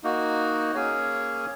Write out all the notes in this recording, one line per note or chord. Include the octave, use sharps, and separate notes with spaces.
A#3 D#4 F#4
A#3 C#4 G#4 C#5